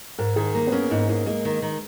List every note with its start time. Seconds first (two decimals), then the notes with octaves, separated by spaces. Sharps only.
0.19 G#2 A#4
0.36 D#3 G#4
0.54 A#3 A#4
0.67 B3
0.72 A#3 C#4
0.91 G#2 D#4
1.08 A#3 D#4
1.26 G#3 A#3
1.45 D#3
1.62 D#3